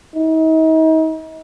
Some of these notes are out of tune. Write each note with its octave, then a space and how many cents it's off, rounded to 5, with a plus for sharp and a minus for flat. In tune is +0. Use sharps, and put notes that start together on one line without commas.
D#4 +40